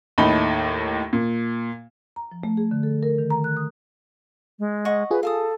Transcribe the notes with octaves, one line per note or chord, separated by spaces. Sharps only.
D#2 A2 A3 D#4 B5 G7
A#2
A#5
F3
A3
G#4
D3
A4
A#4
D#3
A#5
F#6
D#6
G#3
D#5 F#5 C#6
F4 G#4 B4
A4 F5 A5 D#6